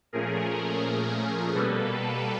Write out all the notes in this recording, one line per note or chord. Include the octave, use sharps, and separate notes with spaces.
A#2 F3 A3 C#4 G#4 A#4
G#4 A#4
B2 G3 A#3 A4 B4